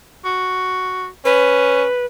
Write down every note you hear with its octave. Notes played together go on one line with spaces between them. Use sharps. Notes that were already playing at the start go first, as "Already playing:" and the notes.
F#4
C#4 B4